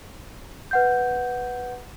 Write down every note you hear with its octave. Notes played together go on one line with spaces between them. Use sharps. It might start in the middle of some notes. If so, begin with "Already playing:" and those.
B4 F#5 G6